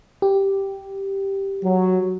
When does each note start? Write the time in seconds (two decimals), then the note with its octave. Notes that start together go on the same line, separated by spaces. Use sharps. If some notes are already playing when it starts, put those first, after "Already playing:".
0.22 G4
1.62 F#3